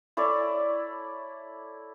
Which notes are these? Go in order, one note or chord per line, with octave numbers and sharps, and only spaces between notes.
E4 A4 C#5 D5